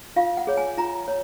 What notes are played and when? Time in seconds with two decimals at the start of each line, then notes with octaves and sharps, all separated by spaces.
0.16 F4 F5
0.37 F#5
0.47 G#4 C#5
0.57 G#5
0.77 F4 A#5
1.08 C#5